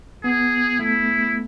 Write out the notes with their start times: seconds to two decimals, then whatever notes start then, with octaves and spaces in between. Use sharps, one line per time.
0.24 B3 G#4
0.79 A3 E4